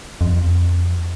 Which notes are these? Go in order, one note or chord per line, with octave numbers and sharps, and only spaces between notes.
F2